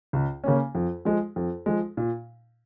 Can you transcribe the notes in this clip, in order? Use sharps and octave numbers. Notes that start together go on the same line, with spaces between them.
C#2
C#3 A#3 C#4
F2
F3 G#3
F2
F3 G#3
A#2